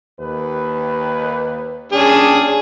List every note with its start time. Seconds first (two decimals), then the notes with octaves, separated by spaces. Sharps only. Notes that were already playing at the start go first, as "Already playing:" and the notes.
0.19 D#2 B4
1.92 A#2 G3 C#4 D4 G#4